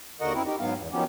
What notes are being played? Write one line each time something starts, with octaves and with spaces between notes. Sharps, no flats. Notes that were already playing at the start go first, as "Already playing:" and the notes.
D#2 D3 F#4 A#4 D#5 F#5
F#2 C4 E4 A#4
D#4 G4 A#4
G#2 F#3 B3 F5
E2
D#3 F3 F#3 B3 C#4 G4